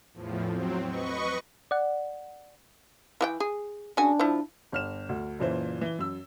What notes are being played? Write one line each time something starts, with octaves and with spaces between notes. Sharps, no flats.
E2 A2 F3
F#3 C4
B4 D#5 C#6
D5 F#5
E3 G4 G5
G#4
C#3 D4 F#4 G#5
F3 E4
G1 F6 E7
D2
F#1 A#2 E3 C5
E3 G7
F#2 E6